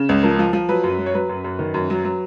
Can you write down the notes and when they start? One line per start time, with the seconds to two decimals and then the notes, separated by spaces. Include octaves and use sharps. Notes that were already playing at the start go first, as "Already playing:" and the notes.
Already playing: C#3
0.09 C#2
0.23 F3 A#4
0.39 F3
0.53 F3
0.69 F#3 B4
0.84 F#2
0.99 F#3
1.06 C#5
1.14 F#3 B4
1.29 F#2
1.44 F#2
1.59 D#3
1.74 F#2
1.90 F#3
2.05 F#3